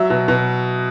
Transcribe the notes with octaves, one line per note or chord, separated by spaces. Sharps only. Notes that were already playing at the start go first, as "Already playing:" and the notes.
Already playing: F#3 E5
B2
B2